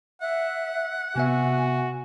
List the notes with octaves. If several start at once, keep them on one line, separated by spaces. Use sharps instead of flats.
E5 F#5
C3 B3 F#4 E5 G#5